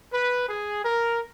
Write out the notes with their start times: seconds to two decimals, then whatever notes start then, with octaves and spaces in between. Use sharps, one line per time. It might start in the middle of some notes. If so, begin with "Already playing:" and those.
0.12 B4
0.47 G#4
0.82 A#4